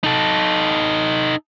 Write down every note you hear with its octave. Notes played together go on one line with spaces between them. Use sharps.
D#4 A4